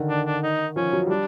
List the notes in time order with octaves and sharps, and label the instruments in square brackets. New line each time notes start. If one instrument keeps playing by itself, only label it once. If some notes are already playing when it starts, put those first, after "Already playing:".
Already playing: [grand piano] D3 D#3
[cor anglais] D4
D4
D#4
[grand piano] F3 [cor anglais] C#4
[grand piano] F#3
[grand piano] G3 [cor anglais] D4